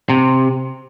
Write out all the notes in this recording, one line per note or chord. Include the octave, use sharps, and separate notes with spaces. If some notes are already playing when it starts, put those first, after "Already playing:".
C3